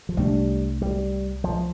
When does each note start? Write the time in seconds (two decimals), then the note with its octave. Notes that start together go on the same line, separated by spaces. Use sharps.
0.09 F3
0.17 C2 C3 G3 A3 D4
0.82 G3
1.44 F3